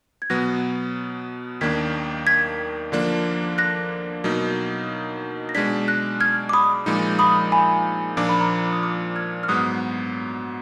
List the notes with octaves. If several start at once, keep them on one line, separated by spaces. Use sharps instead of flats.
G#6
B2 F#3 B3 F#6 A#6
D#2 D#3 A#3 D4 G#6 B6
G#6 B6
D3 F3 A#3 D4
F#6 A#6
B2 F#3 A#3 D#4
A#6
B2 G#3 D4 G#6 B6
F#6 A#6
F6 G#6
D6
B5 D#6
A#2 F3 G#3 D#4
B5 D#6
G#5 B5
A#2 F3 A#3 D4 D6
B5
A#5 D6
D#6
D6 F6
F6 G#6
F6
G#2 F#3 B3 D#6 F#6